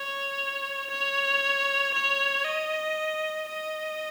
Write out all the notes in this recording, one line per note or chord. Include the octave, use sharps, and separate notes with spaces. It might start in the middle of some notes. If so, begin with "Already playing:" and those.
Already playing: C#5
C#5
C#5
D#5
D#5